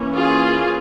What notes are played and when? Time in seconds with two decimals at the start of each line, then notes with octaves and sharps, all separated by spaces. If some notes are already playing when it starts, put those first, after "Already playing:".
Already playing: E3 A#3 C#4
0.16 F4 G#4